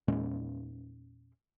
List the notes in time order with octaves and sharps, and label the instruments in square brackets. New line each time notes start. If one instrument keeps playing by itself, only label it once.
[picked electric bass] E2 A#2 G#3 C#4